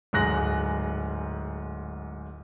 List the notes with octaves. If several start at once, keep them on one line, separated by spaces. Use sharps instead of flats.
D1 G#2 G#3 F#6 A#6 F#7